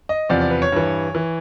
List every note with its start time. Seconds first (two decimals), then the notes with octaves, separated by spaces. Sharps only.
0.09 D#5
0.29 E2 C3 F3 D5
0.41 D5
0.51 B4
0.62 C#5
0.72 G2 E3
1.15 E3